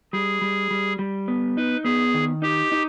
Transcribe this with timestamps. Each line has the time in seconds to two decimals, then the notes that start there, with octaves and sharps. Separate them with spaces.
0.13 G3 G#4
0.41 G3
0.71 G3
0.99 G3
1.28 B3
1.57 D#4 B4
1.85 B3 G#4
2.14 D#3
2.42 D#4 G4
2.72 D#4